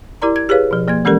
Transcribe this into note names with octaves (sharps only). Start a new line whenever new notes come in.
E4 G4 A#4 D5 A#5 C6
G#6
G4 G#4 B4 C#5 F5
B2 F3
F3 A#3 C6 G#6
E3 G#3 C#4 G4 A4 A#4